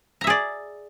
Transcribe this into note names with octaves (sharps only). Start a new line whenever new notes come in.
G#4 D5 E5 A#5